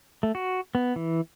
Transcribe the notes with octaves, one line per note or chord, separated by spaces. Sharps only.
A3
F#4
B3
E3